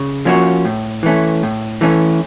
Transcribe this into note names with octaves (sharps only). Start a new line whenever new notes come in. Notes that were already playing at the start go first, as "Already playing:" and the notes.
Already playing: C#3
F3 A#3 C#4 F#4
A2
E3 A3 C#4
A2
E3 A3 C#4